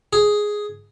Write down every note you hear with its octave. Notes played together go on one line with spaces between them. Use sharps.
G#4